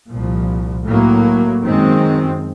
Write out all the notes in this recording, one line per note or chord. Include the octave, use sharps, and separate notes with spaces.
C2 A#2 F3
A2 F#3 A#3
F#2 D#3 G#3 C4